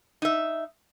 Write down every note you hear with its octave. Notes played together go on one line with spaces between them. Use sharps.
D#4 E5